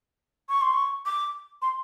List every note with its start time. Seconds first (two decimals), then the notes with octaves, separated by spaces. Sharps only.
0.49 C#6
0.62 C6
0.73 C#6
1.06 D6
1.62 C6